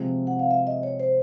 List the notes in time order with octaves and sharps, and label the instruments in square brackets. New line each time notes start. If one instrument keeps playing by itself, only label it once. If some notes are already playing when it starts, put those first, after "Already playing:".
Already playing: [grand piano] C3 F3 G#3 C4
[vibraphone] F#5
F5
E5
D#5
C#5
C5